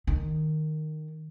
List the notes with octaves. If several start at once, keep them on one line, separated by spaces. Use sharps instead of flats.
D#3